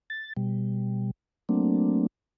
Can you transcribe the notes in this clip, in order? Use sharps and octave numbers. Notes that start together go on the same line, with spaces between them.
A6
B2 G3
F#3 A3 A#3 C4 D4